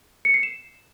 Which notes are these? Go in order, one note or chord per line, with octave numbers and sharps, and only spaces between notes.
C#7
C7
E7